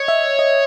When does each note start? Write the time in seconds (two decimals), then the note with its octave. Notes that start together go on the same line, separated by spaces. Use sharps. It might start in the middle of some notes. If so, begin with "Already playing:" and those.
Already playing: C#5 D#5
0.08 E5
0.39 D#5